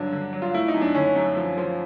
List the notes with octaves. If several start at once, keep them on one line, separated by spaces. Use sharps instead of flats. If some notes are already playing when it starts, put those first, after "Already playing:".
Already playing: G2 D3 F#3 D4
D3
F#3
F4
A3 E4
D#4
F#2
D4
D3 C#4
F#2
F3
F3